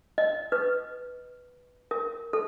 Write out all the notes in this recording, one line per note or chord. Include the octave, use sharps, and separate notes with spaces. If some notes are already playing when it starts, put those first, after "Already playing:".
D#5
B4
A#4
A4